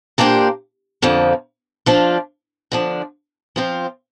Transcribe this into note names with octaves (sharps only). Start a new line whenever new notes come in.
A#2 A#3 D4 G4 C5
F2 D3 F3 A#3
F3 D4 F4
D3 F3 D4
F3 C4 F4 C5